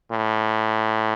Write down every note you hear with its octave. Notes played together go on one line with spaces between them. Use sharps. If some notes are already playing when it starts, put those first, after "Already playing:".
A2